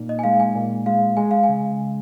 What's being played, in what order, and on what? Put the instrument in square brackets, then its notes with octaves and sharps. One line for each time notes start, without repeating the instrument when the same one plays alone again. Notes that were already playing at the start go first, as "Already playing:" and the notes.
Already playing: [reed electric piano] A#2 A#3 D#4
[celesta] D#5
G#5
[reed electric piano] G#3 [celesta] F5
[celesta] G#5
[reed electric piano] A#2
[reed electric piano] G#3 [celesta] F5
[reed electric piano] G#3 [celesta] G#5
[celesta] F5
G#5
[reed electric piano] C#3